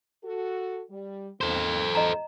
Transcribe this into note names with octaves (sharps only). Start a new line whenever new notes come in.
F#4 A4
G3
D#3 A#3 C4 A4 C5
E2 G#2 D#5 A#5